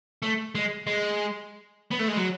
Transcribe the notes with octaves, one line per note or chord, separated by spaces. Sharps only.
A3
G#3
G#3
B3
A3
G#3
F#3